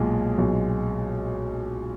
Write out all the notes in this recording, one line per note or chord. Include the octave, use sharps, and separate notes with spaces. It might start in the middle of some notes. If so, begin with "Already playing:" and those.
Already playing: B1 A#2 G#3
B1 A#2 G#3